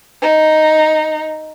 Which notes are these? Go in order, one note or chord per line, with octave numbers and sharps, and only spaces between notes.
D#4